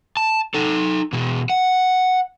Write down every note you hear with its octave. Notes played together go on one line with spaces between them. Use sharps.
A5
D#4 A4
B2 E3
F#5